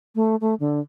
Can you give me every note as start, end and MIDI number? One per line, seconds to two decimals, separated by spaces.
0.15 0.36 57
0.41 0.54 57
0.60 0.80 50